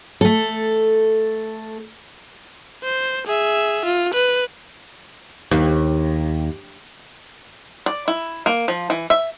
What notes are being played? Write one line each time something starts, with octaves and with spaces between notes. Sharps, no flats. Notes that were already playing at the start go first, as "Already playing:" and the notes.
A3 A4
C5
G#4 E5
F4
B4
D#2
D5
E4
A#3
F3
E3
E5